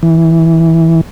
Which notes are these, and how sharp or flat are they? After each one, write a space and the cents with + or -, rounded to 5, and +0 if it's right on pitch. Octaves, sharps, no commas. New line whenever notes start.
E3 -10